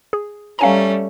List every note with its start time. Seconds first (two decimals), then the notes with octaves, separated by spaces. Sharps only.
0.13 G#4
0.59 G3 A3 C#4 F5 G#5 A#5